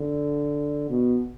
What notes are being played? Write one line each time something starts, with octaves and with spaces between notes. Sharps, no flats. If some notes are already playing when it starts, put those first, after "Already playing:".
Already playing: D3
B2